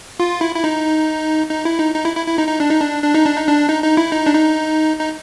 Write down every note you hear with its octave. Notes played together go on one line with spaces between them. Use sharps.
F4
E4
E4
D#4
D#4
E4
D#4
D#4
E4
E4
E4
D#4
D#4
D4
D#4
D4
D4
D#4
D4
D#4
D4
D#4
D#4
E4
D#4
D4
D#4
D#4